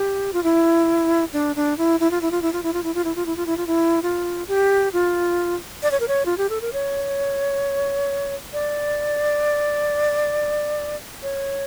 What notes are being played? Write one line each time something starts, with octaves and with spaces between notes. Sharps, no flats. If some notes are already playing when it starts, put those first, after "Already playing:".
Already playing: G4
F4
E4
D4
D4
E4
E4
F4
E4
F4
E4
F4
E4
F4
E4
F4
E4
F4
E4
F4
E4
F4
E4
F4
G4
F4
D5
C#5
A#4
C#5
F4
G4
A4
A#4
C#5
D5
C#5